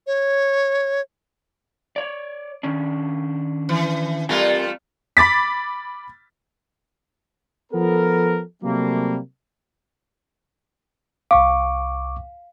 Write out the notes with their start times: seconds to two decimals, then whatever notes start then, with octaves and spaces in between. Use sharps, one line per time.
0.07 C#5
1.96 C#5 D5
2.63 D#3 C#4 D4
3.69 E3
4.29 G3 A3 C4 F4 A#4 G#5
5.17 B5 D6 A6 B6
7.72 F3 B3 A4 A#4
8.63 C3 F#3 G3 A3 A#3
11.31 C2 F5 C#6 D6